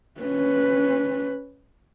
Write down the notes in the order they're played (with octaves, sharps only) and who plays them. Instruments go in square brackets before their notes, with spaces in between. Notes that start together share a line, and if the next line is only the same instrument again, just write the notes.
[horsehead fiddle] C#4 B4